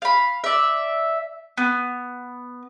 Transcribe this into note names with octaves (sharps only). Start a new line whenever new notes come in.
F5 B5
D5 E5
B3